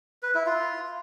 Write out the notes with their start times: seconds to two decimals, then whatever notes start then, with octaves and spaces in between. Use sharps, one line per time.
0.23 B4
0.34 E4
0.46 F4